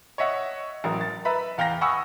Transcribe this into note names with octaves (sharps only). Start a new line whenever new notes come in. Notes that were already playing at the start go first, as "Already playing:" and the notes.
C#5 D#5 E5 F#5
A1 F#3 A#4
A6
B4 E5 A#5 B5
E2 F5 G5 A#5 A#6
F#5 G#5 B5 C#6 D#6 E6